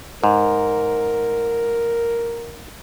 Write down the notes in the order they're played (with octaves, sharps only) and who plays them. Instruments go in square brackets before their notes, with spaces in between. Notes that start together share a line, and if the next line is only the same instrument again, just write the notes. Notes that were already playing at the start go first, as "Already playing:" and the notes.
[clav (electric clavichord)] G#2 [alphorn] A#4